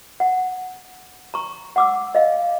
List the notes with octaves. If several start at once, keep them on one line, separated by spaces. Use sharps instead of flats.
F#5
A#5 C#6
F#5 D6 E6
D#5 F5